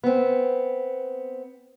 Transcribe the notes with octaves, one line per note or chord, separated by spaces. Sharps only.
B3 C4